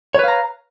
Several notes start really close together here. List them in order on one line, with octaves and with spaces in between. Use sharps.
C#5 B4 F5 A#5